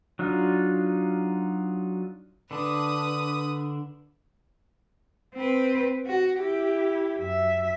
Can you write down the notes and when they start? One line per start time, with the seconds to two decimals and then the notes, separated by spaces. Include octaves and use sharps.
0.19 F#3 D4 D#4 F4
2.51 D3 D4 B4 D#6
5.35 C4 B4
6.06 F#4
6.39 E4 G4
7.20 F#2 E5